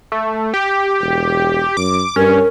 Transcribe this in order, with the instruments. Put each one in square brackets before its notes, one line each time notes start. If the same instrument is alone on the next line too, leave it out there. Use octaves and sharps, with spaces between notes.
[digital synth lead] A3
G4
[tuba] E1
[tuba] F#2 [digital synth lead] D6
[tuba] G2 [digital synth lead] C#4 [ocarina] A#4